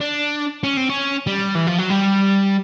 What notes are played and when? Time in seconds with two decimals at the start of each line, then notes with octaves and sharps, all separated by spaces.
0.01 D4
0.63 C#4
0.77 C4
0.90 C#4
1.27 G3
1.55 E3
1.67 F3
1.78 F#3
1.90 G3